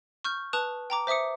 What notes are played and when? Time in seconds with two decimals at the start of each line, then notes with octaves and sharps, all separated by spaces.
0.25 C#6 F6 G6
0.53 B4 A5 D#6 F#6 F7
0.90 G5 A#5 D6
1.07 C5 E5 D6 D#6 C#7